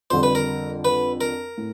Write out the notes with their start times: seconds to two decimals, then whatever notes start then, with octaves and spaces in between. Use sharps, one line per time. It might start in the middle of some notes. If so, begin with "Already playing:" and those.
0.10 F2 D3 G3 C5
0.23 B4
0.35 A#4
0.85 B4
1.21 A#4
1.58 A2